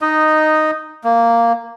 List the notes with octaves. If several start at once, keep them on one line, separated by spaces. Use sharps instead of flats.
D#4 D#5
A#3